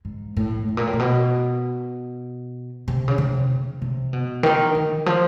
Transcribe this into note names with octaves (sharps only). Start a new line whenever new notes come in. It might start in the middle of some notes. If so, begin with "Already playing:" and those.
G#2
A2
A2
A#2
A2
A#2
B2
C3
C#3
C3
C#3
C3
B2
D#3
D#3
F3